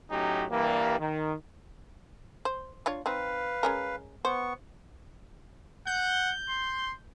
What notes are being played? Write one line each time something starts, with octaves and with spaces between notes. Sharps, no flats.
A2 F#3 C#4 D#4 G4
G2 E3 G3 A#3
D#3
C5
D4 F4 C#5
C4 D#4 B4 F5
G#3 C#4 A#4
B3 C5 C#6
F#5 G6
C6